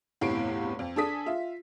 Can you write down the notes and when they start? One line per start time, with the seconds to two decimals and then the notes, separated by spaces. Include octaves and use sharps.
0.21 G1 E2 A2 C3 C7 D7
0.79 F2
0.96 D4 G#4 A4 D#6 B6
1.26 F4 E5